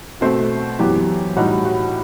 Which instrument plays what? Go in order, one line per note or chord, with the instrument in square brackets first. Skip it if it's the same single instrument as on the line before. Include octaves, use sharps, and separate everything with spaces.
[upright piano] B2 A3 C4 C5
F#2 E3 B3 G4
A2 G3 D#4 F#4
F#4